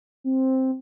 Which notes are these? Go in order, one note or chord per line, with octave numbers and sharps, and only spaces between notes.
C4